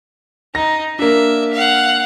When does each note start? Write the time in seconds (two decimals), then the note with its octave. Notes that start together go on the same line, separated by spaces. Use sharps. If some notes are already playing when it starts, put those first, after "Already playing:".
0.55 D#4 A#6
0.99 A#3 D4 E5
1.53 F5 F#5